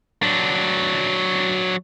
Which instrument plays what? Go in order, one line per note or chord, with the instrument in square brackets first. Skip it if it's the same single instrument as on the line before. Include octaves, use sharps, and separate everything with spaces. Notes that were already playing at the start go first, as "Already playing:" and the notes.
[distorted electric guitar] F#3 D4